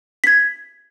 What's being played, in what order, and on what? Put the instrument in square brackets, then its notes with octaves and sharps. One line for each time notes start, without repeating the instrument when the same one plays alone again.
[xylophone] G#6 B6